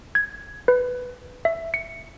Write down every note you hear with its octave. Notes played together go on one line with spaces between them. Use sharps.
G#6
B4
E5
C#7